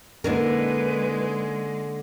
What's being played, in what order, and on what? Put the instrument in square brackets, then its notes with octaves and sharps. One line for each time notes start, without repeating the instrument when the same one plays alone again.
[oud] D3 D#4 A#4 [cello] G#3 [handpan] A#3 C#4 [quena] B4